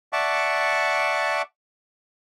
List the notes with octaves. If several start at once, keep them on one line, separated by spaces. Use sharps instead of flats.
D5 E5 F#5 A5 C#6 D6